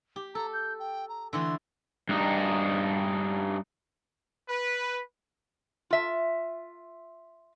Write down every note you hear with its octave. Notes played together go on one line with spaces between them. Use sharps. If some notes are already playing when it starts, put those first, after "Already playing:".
G4
A4 A#5
G6
G5
A#5
D3 E3 A3 C6
G2 D#4
B4
F4 E5